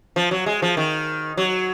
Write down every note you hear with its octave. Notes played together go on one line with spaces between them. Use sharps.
F3
F#3
G#3
F3
D#3
F#3